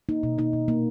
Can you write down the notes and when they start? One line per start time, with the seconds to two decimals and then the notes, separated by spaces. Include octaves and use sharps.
0.09 A#3 D#4
0.23 B2
0.38 A#3 D#4
0.53 B2
0.68 A#3